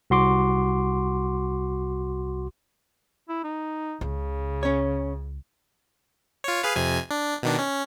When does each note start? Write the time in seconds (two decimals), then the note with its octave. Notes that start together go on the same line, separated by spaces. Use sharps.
0.10 C2 F#4 C6 D6
3.29 E4
3.44 D#4
4.01 C#2 C#3
4.63 C#4 C#5
6.44 F4 C#5
6.63 G#4 B4 F5
6.76 F2 C3 G#5
7.11 D4
7.43 B2 D#3 D4
7.59 C#4